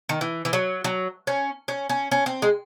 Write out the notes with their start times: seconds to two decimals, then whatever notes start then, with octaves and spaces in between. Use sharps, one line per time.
0.09 D#3
0.21 E3
0.45 E3
0.53 F#3
0.84 F#3
1.27 C#4
1.68 C#4
1.89 C#4
2.11 C#4
2.26 C4
2.42 G#3